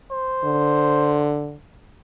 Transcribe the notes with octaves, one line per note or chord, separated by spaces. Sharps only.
C5
D3